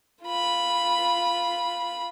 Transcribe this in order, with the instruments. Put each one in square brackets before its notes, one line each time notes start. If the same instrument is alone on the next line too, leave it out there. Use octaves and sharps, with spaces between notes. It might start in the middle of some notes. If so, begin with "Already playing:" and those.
[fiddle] F4 B5